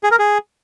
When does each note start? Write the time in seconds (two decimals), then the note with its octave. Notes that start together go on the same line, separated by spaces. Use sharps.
0.03 G#4
0.11 A#4
0.19 G#4